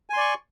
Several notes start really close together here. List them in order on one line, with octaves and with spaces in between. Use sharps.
G#5 C6 D5 C#6